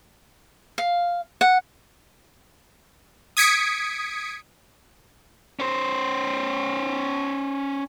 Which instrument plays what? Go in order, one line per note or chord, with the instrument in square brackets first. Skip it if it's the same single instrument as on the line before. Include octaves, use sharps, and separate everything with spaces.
[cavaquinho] F5
F#5
[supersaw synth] D#6 G#6 B6 C#7 D7
[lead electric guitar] C#4 C5